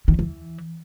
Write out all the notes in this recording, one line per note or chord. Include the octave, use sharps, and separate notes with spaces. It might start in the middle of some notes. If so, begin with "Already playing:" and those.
D#3
E2
E3